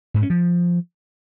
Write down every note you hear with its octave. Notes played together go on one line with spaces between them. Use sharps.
G#2
C#4
F3